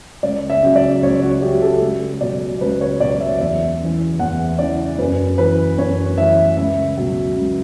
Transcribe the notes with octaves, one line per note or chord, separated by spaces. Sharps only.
C#2 D5
E5
C#3 F#3
D5
C#2 C#5
F#4
C#3 F#3 G4
A4
C#2
B2 F#3 D5
C#2 B4
C#5
B2 F#3 D5
E5
E2 E5
C#3 E3
E2 F#5
C#3 E3 D5
F#2 B4
E3 B4
F#2 C#5
E3 E5
C#2 E5
B2 F#3
C#2